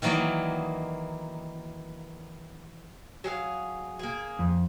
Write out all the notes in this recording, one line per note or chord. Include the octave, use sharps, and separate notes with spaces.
D#3 E3 F#3 A#3 D5 D#5
F#3 G#4 F5
A#3 G#4
F2